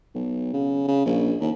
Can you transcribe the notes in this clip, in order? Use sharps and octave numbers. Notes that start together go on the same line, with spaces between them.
B1
C#3
C#3
A#1
D#2